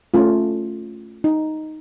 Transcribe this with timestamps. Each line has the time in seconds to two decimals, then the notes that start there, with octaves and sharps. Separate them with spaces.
0.14 A3 C#4 F4
1.24 D#4